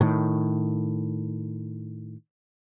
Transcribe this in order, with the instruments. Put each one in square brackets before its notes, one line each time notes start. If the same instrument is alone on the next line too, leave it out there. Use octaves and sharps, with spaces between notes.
[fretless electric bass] A2 D#3